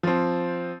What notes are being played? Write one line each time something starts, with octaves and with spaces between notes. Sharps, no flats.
F3 C4